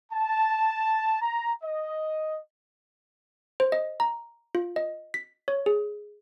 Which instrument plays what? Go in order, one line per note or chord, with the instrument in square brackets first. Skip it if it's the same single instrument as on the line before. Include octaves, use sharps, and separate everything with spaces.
[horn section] A5
A#5
D#5
[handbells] C5
D#5
A#5
F4
D#5
B6
C#5
G#4